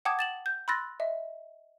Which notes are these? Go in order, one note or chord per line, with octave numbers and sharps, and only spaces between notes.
F#5 G5 A5 D6 D#6 G#6
A6 E7 F#7
G6
B5 C6 E6 F#6 A6 A#6
D#5 E5